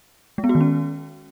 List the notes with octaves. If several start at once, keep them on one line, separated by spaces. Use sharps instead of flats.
G#3
B3
F#4
D#3
C#4